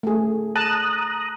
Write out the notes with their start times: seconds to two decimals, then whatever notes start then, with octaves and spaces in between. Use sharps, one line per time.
0.03 A3 G#4
0.56 A5 A#5 D#6 F#6